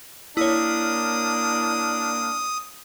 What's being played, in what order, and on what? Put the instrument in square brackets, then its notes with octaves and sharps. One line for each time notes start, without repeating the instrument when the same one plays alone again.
[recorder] A#3 [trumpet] D4 [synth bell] E4 C#5 [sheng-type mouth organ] D#6